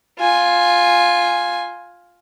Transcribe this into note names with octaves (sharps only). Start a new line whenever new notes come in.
F4 G#5